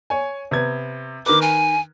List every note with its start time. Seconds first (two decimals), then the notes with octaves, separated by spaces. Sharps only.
0.10 C#5 G#5
0.51 C3 B3 G#6
1.26 D#3 A#4 B4 D6
1.42 G#5